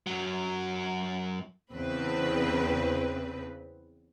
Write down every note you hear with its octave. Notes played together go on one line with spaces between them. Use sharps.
F#2 F#3
E2 C#3 C4 B4